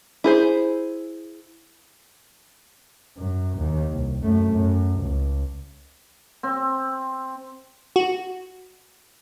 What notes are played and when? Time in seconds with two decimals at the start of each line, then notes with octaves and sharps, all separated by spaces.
0.24 E4 G#4 C5
3.18 F#2
3.58 D#2
3.91 C2
4.22 F#2 A3
4.52 F#2
5.01 C#2
6.43 C4
7.96 F#4